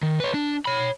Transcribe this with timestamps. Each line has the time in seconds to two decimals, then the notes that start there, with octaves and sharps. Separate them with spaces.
0.03 D#3
0.20 B4 C#5
0.34 D4
0.65 C#5 B5